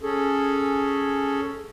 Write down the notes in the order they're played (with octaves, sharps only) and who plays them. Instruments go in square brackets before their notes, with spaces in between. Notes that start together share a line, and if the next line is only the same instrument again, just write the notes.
[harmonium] C#4 G#4 A4